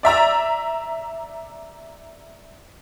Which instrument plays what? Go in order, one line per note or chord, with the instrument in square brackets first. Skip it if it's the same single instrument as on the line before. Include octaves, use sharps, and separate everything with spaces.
[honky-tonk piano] D5 E5 A#5 E6